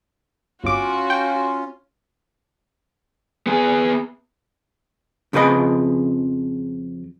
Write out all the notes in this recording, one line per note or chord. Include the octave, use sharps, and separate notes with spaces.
G1 C#4 F4 F#4 D6
G5
B3 G#4
F2 C#3 F3 G#4 B4 D#5